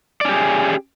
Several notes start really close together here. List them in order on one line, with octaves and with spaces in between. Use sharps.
D5 C#4 G4 G#4